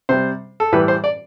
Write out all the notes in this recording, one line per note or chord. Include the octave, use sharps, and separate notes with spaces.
C3 G3 C5
A4
A2 E3 G3 B4
C5
D5